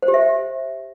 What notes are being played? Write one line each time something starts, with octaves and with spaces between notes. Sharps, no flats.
C5
G4
E5